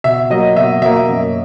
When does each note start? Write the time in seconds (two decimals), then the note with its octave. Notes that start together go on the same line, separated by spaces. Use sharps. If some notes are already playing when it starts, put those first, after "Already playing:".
0.04 B2 E5
0.30 F#3 A#3 D#5
0.57 B2 E5
0.82 F#3 A#3 E5
1.09 F#2